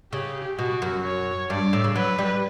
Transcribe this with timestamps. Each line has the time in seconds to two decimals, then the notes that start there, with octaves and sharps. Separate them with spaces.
0.13 C#3 G4
0.58 B2 F#4
0.82 F#2
1.04 C#5
1.50 G2 D5
1.73 A2
1.84 C#3
1.96 F#3 B4
2.18 G3